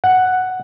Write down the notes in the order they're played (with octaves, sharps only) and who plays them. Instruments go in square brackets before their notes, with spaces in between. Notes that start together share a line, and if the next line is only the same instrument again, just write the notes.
[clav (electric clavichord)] F#5